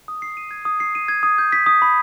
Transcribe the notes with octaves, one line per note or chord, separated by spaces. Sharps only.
D#6
C7
D#7
G#6
D#6
C7
D#7
G#6
D#6
G6
B6
D#6
B5